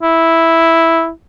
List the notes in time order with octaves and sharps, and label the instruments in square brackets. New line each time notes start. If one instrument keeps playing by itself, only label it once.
[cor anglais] E4